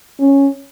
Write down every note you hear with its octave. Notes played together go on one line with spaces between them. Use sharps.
C#4